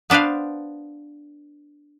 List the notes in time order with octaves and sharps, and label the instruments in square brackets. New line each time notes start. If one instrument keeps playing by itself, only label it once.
[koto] B3 D4 B4 C5 F5